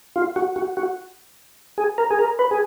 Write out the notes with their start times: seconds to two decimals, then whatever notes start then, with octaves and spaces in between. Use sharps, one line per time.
0.16 F4
0.36 F#4
0.56 F#4
0.77 F#4
1.78 G#4
1.98 A#4
2.11 G#4
2.19 A#4
2.39 B4
2.51 G#4